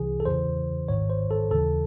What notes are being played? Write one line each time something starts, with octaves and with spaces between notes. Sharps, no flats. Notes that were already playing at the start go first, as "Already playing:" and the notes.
Already playing: C2 C3 E3 G#4
A4
E2 C#3 E3 C5
G#1 G#2 D#3 C#5
C5
A4
D#2 C#3 E3 A4